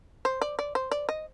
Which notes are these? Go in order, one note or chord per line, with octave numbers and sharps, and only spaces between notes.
C5
D5
D5
C5
D5
D#5